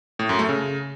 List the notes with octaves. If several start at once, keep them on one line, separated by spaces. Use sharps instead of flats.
A2
F#2
A3
C#3